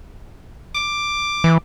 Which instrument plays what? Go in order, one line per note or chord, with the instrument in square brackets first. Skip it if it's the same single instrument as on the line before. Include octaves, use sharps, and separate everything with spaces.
[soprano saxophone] D6
[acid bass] E3